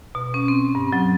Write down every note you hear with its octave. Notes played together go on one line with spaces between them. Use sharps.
B2
C#4
C4
G2
F#3